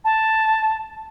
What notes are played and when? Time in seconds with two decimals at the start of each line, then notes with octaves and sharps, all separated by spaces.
0.05 A5